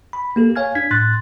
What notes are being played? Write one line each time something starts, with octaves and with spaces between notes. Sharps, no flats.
B5
A#3 G4 A4
C#5 F5 G#5 F6 G#6
D4 G#6 B6
A2 C6 F#6 A6